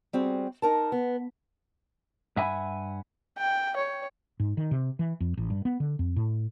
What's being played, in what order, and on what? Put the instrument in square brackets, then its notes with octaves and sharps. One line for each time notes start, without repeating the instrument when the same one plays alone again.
[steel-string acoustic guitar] G3 C4 F#4 G#4
D#4 A#4 A5
B3
[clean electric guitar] G2 E5 F#5 G#5 B5
[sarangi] G5
C#5
[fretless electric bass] G#2
D#3
C3
E3
F2
A1
G2
B3
D3
F2
A2